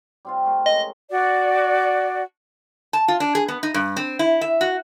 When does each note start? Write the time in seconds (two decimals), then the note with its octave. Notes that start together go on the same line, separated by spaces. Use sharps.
0.25 G3 C4 F4
0.45 A3 F4 A#4
0.66 G#3 C#4 D#5
1.10 F#4 D5
2.93 A5
3.08 F4
3.20 D4
3.35 G#4
3.48 B3
3.63 D#4
3.74 G2
3.97 C4
4.19 E4
4.41 E5
4.61 F#4